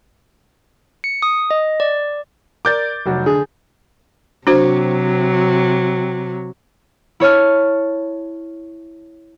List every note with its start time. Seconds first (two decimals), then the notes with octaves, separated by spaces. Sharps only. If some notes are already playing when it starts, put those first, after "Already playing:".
1.04 C#7
1.22 D#6
1.51 D#5
1.80 D5
2.65 A#4 D5 D6 G6 A6
3.06 F1 F#3 F#4
3.26 D3 G#4
4.47 C3 F#3 D4 F#4 C5
7.20 E4 C#5 A5 F6